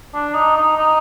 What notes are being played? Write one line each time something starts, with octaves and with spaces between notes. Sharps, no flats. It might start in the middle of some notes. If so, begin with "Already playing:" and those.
D4
D#4
D#4
D#4